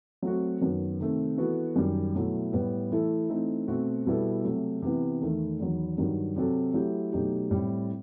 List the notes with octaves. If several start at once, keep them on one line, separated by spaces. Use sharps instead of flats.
F#3 A3 C4 F#4
F#2 D#3 F#3 B3
C3 D#3 A3 C4
E3 B3 F#4 A4
F#2 D#3 G3
B2 F#3 A3 E4
A2 G3 B3
E3 A3 E4 A4
E3 A3 C4 D#4
B2 A3 C4 F#4
B2 G3 B3 E4 A4
C3 F#3 A3
C3 E3 B3
E2 D#3 A3
E2 D#3 F#3
G2 D#3 F#3
C3 F#3 C4 F#4 A4
F#3 A3 E4 G4
B2 F#3 A3 D#4 G4
A2 G3 C4 E4